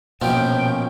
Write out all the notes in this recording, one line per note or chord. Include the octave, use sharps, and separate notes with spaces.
A#1 B2 D#3 F3 B3 C#4 C5 G5